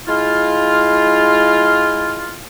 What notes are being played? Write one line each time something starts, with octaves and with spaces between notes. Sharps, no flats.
G#3 E4 F4